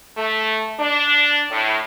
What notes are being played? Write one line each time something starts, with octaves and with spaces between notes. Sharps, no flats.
A3
D4
A2